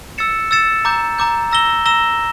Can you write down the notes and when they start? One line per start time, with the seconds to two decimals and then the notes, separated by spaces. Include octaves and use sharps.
0.18 E6 A6 C#7 E7
0.51 E6 A6 C#7 E7
0.85 A#5 D6 G6
1.19 A#5 D6 G6
1.51 A#5 E6 A#6 E7 G7
1.85 A#5 E6 A#6 E7 G7